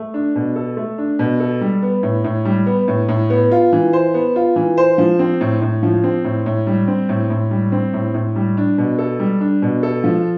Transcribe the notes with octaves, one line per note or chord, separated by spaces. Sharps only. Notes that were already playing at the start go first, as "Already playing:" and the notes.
Already playing: A3
D4
B2
A4
A3
D4
B2
A4
G3
B3
A2
A2
G3
B3
A2
A2
B3
F4
E3
C5
B3
F4
E3
C5
F3
C4
A2
A2
F3
C4
A2
A2
G3
C4
A2
A2
G3
C4
A2
A2
G3
D4
B2
A4
G3
D4
B2
A4
F3